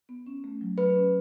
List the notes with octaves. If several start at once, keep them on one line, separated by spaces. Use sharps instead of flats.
B3
C#4
A3
F#3
F#3 B4
C#4